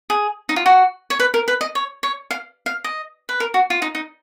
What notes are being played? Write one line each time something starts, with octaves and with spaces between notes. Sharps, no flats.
G#4
D#4
F4
F#4
C#5
B4
A#4
B4
D#5
C#5
C#5
F5
F5
D#5
B4
A#4
F#4
F4
D#4
D#4